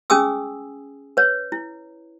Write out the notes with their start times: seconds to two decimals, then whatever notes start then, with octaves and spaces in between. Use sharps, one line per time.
0.10 C#4 G#4 G#5 D#6 E6
1.17 B4 C#5
1.52 E4